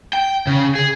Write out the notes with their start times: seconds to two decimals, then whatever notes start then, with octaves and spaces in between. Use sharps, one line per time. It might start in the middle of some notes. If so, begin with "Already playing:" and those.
0.13 G5
0.47 C#3
0.75 G#4